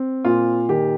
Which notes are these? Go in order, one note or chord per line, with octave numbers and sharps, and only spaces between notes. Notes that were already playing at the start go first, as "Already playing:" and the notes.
Already playing: C4
A#2 F4
D#3 G4